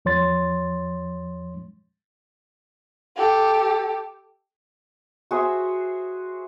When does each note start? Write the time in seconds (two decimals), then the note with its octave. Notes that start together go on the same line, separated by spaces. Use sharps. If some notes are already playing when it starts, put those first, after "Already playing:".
0.05 E2 F3 C#5 C6 A6
3.16 G4 A4
5.31 F#4 G#4 C5 E5